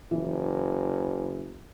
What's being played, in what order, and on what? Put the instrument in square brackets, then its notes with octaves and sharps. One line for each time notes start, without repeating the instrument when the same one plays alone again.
[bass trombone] F#1 [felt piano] E3